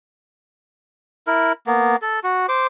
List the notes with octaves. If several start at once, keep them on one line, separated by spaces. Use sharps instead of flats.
E4 A#4
A#3 B3
A4
F#4
C5 D6